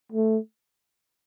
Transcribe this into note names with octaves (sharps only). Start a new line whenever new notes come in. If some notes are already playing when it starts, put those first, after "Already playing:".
A3